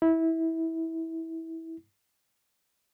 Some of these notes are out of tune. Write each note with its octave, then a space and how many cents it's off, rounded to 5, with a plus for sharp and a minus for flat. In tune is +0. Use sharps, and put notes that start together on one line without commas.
E4 -20